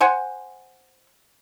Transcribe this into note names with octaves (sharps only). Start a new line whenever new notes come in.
C5 F#5 G#5